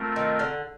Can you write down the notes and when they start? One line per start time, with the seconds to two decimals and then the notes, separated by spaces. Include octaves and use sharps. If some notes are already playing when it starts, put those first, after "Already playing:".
Already playing: A3 C4 F4 A#4
0.16 D#3
0.39 D3